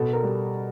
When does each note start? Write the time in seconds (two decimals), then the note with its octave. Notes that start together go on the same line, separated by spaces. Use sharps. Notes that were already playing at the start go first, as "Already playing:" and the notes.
Already playing: B2 A4
0.13 A#4
0.23 G3